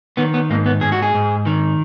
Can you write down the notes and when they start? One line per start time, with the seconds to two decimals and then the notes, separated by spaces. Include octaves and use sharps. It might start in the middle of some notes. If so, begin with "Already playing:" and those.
0.17 D#3 B3
0.34 B3
0.50 G#2 A#3
0.66 B3
0.81 G#2 G#4
0.92 F#4
1.02 G#4
1.14 G#2
1.46 D#3